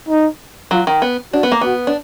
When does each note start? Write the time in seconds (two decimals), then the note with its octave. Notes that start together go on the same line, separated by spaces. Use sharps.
0.08 D#4
0.71 F#3 F4
0.87 D#3
1.02 B3
1.33 D4 F#4
1.43 B3
1.52 A#3
1.61 B3 F#4
1.87 D4